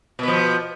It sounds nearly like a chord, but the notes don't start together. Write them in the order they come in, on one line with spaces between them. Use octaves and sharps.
B2 B3 F3